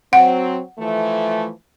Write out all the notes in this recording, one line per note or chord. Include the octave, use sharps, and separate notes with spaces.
F#3 C4 F#5
E3 F3 A3